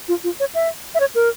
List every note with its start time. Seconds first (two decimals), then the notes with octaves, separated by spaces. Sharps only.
0.08 F4
0.24 F4
0.40 C#5
0.55 E5
0.95 E5
1.00 C#5
1.15 A#4